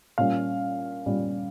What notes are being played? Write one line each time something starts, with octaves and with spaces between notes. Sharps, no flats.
A#2 G3 C#4 F5
A#2 G3 C#4